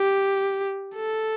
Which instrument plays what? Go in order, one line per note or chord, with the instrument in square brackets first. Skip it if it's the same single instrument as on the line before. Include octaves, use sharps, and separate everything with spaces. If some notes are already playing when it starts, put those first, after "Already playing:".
Already playing: [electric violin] G4
A4